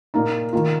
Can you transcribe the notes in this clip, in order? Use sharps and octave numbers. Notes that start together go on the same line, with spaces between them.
A#2 A#3 D#4
D#3 A#3 F4